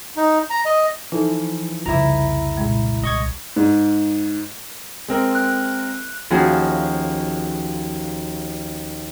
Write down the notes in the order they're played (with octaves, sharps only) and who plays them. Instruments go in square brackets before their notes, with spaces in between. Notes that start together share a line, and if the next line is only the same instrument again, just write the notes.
[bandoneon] D#4
A#5
D#5
[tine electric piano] E3 F3 [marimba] D#4 A4
[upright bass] C2 F2 [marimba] C#3 F4 [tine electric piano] E4 A#5
[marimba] A#2 G#3
[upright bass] C2 [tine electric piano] D#5 C#6 G#6
[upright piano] G#2
[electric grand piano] G#3 C4 A#4
[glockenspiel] F#6
[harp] D#2 F3 C#4 F#4 G#4